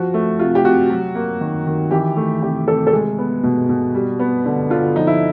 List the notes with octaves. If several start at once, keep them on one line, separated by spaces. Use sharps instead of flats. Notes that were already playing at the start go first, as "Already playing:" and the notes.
Already playing: F3 F#4
A3
C3 F4
G4
C3 F#4
F#3
A#3
D#3
D#3
E3 G4
A3
C3 G4
C3 A4
A4
G#3 G#4
B3
B2
B2
G3
B3
D3
D3 F4
F3 D#4
E4